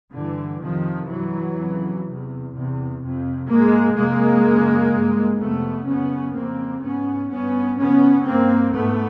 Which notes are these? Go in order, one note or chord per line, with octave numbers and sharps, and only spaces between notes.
G2 D3 E3
F2 C3 D#3 F3
G2 E3 F#3
F2 C#3
E2 C3
E2 C3
F2 C3
G#2 G#3 A#3
F2 C3 G#3 A#3
F#2 C#3
G2
F2 C3 A3 B3
F#2 C#3 B3 C#4
F2 C#3 A#3 C4
G#2 B3 C#4
G2 B3 C#4
F#2 C#3 B3 C#4
G2 A#3 C4
G#2 A3 B3